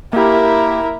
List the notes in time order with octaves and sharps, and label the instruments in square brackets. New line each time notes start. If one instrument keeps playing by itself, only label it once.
[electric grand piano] A#3 G4 [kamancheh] E4 A#4